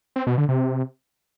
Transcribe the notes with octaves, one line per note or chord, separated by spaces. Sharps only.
C4
B2
D3
C3